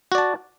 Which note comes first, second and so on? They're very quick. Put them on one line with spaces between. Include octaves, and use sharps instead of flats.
F#4 D5 A5